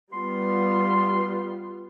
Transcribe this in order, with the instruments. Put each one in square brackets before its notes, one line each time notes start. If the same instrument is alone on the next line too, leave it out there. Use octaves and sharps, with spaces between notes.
[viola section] G3 B3 F4 [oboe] C6